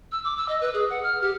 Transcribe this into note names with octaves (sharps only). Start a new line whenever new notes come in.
E6
D6
E6
D#5
B4
G#4
F#5
F6
G4